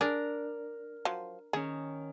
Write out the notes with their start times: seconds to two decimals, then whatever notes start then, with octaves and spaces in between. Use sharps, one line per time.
0.01 D4 G#4 A#4
1.05 F3 F#3
1.53 D#3 C#4 G#4